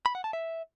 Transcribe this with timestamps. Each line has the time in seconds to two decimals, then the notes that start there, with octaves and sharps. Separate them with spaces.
0.06 B5
0.15 F#5
0.24 A5
0.33 E5